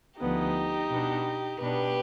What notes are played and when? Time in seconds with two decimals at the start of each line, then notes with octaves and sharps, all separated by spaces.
0.20 D2 D3 F3 B3 D#4 G4
0.91 B2 B3 D4
1.61 B2 B3 D4 G4 B4